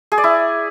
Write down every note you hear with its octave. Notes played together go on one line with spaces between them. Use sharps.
G#4
D5
E4